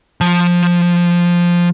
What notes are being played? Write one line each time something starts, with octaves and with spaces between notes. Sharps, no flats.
F3 A5